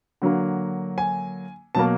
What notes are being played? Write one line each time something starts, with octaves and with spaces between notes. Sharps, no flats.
D3 F#3 A#3
G#5
B2 F#3 A#3 A5